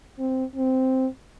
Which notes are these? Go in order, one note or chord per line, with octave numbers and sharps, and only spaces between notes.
C4
C4